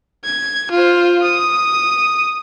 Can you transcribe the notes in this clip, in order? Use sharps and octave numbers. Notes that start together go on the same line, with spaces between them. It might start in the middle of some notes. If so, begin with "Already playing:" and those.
G#6
F4 C5
D#6